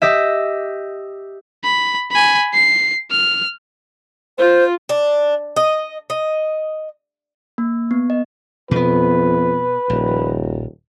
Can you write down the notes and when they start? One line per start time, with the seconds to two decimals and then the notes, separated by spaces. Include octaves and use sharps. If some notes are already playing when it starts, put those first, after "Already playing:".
0.02 G4 D#5 E5
1.64 B5
2.11 G#5 B5
2.54 C7
3.11 F6
4.38 F4 C5
4.89 D4
5.56 D#5
6.10 D#5
7.58 A#3
7.91 B3
8.10 D#5
8.71 F2 B2 B3 B4
9.90 D#1 A#1